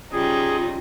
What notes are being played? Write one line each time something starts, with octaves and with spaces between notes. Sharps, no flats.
C#3 G3 D#4 F4 G#4